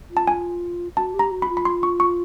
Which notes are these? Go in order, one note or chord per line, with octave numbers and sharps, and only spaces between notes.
F4
A5
G#5
F#4 A5
G4
A#5
F#4
B5
F4
B5
C6
C#6
C#6